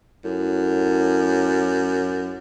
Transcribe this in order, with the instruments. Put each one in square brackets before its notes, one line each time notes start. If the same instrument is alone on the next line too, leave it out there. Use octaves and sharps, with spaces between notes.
[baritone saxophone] F#2 [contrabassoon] A2